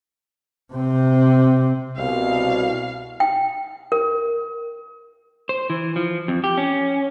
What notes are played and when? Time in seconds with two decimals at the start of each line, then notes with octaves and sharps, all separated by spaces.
0.74 C3 C4
1.97 C2 B2 F5
3.20 G5
3.92 A#4
5.49 C5
5.70 E3
5.96 F3
6.28 F2
6.44 G4
6.57 C#4